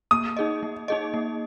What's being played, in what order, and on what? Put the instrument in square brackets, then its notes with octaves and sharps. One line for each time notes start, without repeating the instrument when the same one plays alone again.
[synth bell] A#3 [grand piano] D#6
[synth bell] D#4 G#4 D#5
A#3
D#4 G#4 D#5
A#3